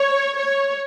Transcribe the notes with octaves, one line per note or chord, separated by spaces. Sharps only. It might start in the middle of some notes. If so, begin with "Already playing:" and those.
Already playing: C#5
C#5